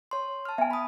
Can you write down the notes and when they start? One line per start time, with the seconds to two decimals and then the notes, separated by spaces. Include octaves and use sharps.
0.11 C#5 C6
0.45 A5 F6
0.58 B3 E5 G#5
0.71 B5 D#6